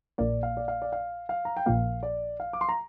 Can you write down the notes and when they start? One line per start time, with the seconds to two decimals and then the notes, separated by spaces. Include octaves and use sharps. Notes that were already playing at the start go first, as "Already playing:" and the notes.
0.18 A#1 A#2 A#3 D5
0.43 F5
0.57 D5
0.68 F5
0.82 D5
0.92 F5
1.29 F5
1.45 A#5
1.57 G5
1.66 A#1 A#2 F3 A#3 F5
2.03 D5
2.40 F5
2.53 D6
2.61 C6
2.69 A#5